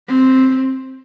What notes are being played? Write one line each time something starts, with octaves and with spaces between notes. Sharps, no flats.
C4